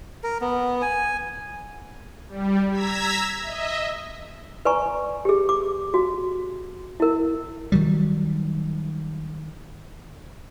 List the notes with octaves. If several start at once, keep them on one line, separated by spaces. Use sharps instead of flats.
A#4
B3
G#5
G3
A#5 E6 G#6 B6
D#5 E5
B4 D5 G#5 A#5 C#6
G4 G#4
D6
F#4
E4 A#4
D#3 F#3 G3